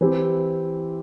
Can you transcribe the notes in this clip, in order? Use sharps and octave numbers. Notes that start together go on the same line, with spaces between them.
E3 C4 E4 G4